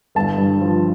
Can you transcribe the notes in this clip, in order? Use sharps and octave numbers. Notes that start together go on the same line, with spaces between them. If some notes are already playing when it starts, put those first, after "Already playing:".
G1 A5
G2
F3